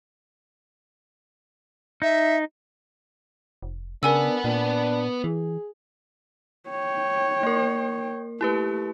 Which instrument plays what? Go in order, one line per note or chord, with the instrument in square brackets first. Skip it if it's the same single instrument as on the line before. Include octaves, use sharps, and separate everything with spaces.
[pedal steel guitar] D#4 [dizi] E5
[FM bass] F1
[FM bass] C#3 [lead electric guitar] B3 F#5 [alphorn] D4 [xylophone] A#4 G#5 E6
[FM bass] A#2 [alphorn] D4
[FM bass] E3 [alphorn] G#4
[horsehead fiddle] C#5 G5
[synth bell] A#3 A#4
[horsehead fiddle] A3 [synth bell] E4 G4 B4